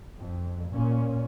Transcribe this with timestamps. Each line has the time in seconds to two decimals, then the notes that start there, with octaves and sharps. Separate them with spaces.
0.19 F2
0.73 A#2 C#4